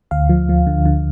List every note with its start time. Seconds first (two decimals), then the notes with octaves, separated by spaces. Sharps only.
0.11 D2 F5
0.29 F3
0.49 F3
0.67 D3
0.86 D3